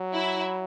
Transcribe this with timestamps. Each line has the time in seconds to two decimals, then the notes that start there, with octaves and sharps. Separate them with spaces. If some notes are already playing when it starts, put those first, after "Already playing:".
Already playing: F#3
0.13 E4